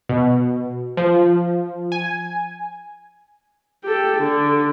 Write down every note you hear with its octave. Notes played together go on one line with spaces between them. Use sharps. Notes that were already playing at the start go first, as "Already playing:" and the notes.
B2
F3
G#5
G4 A4
D3